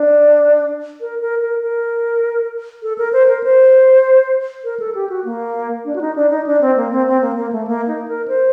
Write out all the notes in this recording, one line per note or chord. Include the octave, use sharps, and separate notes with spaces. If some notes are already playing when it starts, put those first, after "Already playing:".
Already playing: D4
A#4
A#4
A#4
A#4
A4
A#4
C5
A#4
C5
A#4
A4
G4
F#4
A#3
D4
F#4
D#4
D4
D#4
D4
C4
A#3
C4
C4
A#3
A#3
A3
A#3
D#4
A#4
C5